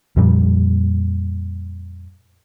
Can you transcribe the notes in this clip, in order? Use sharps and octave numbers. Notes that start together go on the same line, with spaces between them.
F2 A#2 F3 G3